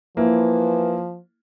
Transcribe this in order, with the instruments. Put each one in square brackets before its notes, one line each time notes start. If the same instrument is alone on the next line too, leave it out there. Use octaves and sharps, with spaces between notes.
[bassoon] E3 [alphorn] F3 [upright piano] A#3 E4